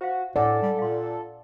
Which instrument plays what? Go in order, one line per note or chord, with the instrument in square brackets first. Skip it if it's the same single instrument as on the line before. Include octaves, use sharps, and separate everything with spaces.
[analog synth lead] F#4 [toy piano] C5 F5
[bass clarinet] A2 [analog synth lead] A4 [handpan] D5 [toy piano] F#5 G#5
[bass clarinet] G3
[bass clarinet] A#2 [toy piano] F5 C6